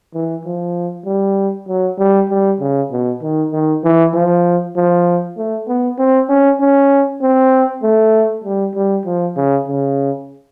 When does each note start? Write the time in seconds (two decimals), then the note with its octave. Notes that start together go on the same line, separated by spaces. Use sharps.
0.14 E3
0.45 F3
1.06 G3
1.68 F#3
1.98 G3
2.30 G3
2.60 C#3
2.92 B2
3.22 D#3
3.52 D#3
3.84 E3
4.14 F3
4.76 F3
5.37 A3
5.68 B3
5.99 C4
6.29 C#4
6.60 C#4
7.22 C4
7.83 A3
8.44 G3
8.75 G3
9.06 F3
9.36 C#3
9.68 C#3